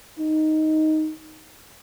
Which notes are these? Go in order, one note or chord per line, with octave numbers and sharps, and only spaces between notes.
D#4